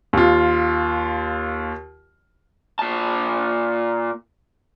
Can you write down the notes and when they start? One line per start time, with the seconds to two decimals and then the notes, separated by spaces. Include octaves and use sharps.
0.13 D#2 F4
2.79 A#2 A5